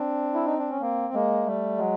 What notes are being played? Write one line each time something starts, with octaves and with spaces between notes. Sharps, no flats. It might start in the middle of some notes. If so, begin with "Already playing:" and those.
Already playing: C4 D4
E4
D#4
D4
C#4
A#3 C4
G#3 A#3
G3 A3
F#3 G#3